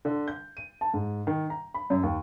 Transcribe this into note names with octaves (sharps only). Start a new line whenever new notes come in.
D3
G6
D#7
A5
G#2
D#3
A#5
B5
F#2
D#2